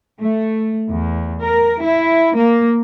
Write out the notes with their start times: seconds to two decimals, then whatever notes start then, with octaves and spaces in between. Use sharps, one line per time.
0.20 A3
0.88 E2
1.42 A#4
1.83 E4
2.36 A#3